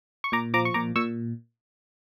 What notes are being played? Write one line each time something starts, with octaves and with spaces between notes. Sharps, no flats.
C#6
A#2 A#5 D6
F3 A#5 D6
C#6
A#2 A#5 D6
A#2 C#6 E6